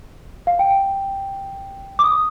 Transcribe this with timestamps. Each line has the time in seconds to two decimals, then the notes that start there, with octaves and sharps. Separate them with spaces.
0.47 F5
0.59 G5
1.99 D6
2.04 D#6